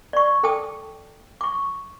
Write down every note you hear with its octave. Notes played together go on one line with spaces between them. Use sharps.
D5 C#6
A4 G5 A5 D6 D#6
C#6 D6